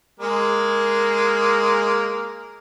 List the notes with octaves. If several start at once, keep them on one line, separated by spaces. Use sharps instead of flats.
G#3 A#3